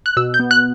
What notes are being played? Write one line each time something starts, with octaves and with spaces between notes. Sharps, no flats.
F#6
B2 E6
G6
B3
F#6